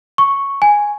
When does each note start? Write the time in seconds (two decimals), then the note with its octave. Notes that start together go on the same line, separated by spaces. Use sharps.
0.18 C#6
0.62 G#5